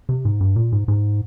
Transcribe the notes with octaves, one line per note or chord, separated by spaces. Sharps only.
C3
G#2
G2
A#2
G#2
G#2